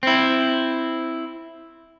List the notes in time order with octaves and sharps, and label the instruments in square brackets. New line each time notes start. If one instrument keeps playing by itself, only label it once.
[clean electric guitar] C4 E4